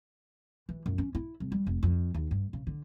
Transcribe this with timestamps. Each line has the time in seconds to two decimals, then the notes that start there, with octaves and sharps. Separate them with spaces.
0.69 E3
0.86 F#2
0.98 C#4
1.15 E4
1.40 C2
1.52 G3
1.67 F1
1.83 F2
2.14 D#2
2.31 G2
2.53 C#3
2.67 D3